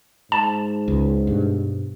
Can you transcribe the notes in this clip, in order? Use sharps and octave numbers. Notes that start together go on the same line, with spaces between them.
G#2 A5
C#2
G2 B2